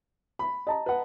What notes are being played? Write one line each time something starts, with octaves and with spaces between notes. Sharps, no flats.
B5
D#5 A5 A#5
B4 F#5